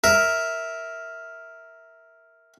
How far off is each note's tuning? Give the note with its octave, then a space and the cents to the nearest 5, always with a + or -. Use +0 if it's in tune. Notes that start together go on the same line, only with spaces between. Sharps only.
A#4 +0 E5 -10